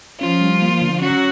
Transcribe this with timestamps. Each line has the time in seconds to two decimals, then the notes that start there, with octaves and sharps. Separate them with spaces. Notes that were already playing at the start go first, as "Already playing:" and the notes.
0.20 F3 C#4 F4
0.41 G3
0.62 A#3
0.81 D3
1.01 F#3 C#4 F#4